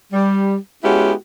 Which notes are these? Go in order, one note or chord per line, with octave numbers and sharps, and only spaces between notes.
G3
G#3 B3 C#4 E4 F#4 G4